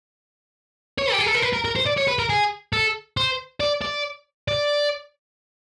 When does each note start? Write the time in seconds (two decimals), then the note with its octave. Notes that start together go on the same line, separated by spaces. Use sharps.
0.98 C#5
1.12 G4
1.19 G#4
1.27 A4
1.35 A#4
1.43 B4
1.53 A#4
1.65 A#4
1.76 C5
1.86 D5
1.97 C#5
2.07 B4
2.19 A#4
2.29 G#4
2.73 A4
3.17 C5
3.60 D5
3.82 D5
4.48 D5